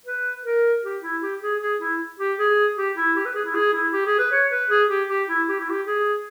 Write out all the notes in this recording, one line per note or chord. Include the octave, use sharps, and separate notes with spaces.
B4
A#4
G4
E4
G4
G#4
G#4
E4
G4
G#4
G4
E4
G4
B4
G#4
E4
G#4
E4
G4
G#4
B4
C#5
B4
G#4
G4
G4
E4
G4
E4
G4
G#4